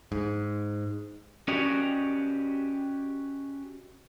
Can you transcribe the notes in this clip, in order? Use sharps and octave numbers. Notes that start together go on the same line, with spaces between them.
G#2
C#4 F#4 G4 D5 D#5